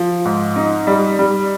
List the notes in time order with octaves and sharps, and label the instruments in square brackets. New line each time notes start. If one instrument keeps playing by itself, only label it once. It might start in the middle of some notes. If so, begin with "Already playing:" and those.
Already playing: [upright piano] F3
G#2
D#4
G3
G3